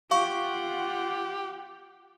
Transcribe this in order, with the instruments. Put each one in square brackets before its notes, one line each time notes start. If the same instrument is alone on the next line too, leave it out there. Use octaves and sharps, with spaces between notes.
[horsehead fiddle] F4 F#5 [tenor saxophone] G4 [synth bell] F5 C#6